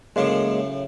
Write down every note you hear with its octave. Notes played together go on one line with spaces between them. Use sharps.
F#2 A2 C#3 G#3 A#3